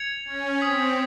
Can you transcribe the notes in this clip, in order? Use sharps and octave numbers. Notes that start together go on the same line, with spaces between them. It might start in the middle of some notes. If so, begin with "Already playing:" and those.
Already playing: G#6 C#7 F7
C#4
C4 D#6 G#6 B6